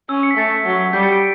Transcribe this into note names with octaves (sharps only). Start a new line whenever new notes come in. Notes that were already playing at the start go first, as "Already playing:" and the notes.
C#4 E6
C#7
B6
A3 A6 C#7
F#3
G3 G6 B6
A6 C#7
D7